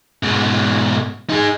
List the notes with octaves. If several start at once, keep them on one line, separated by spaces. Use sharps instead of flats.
G#2 B2
D#4 G#4